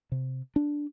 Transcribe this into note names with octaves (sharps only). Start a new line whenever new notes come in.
C3
D4